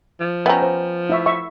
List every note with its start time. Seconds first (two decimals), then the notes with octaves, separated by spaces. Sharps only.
0.20 F3
0.46 B3 C#4 E5 G5 A#5
0.62 C5
1.10 E4 E5 C#6
1.26 E5 C#6